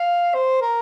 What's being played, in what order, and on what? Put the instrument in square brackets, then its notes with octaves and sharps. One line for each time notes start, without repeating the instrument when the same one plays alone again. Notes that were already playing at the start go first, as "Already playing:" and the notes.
Already playing: [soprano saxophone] F5
C5
A#4